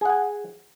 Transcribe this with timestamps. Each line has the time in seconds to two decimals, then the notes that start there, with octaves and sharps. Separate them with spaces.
0.01 G#4
0.05 F#5
0.10 G#5